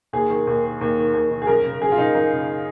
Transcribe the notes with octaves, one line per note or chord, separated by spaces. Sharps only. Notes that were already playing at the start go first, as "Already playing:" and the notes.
D#2 G#4
D#3
D#2
D#3
D#2
D#3
D#2
D#3
G#4
F#2 A#4
C#3
F#2 G#4
F4
C#3 D#4
F#2 D#4
C#3